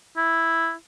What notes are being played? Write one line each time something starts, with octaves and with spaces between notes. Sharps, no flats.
E4